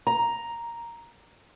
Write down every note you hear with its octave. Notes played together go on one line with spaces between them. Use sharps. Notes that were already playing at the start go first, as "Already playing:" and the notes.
A#5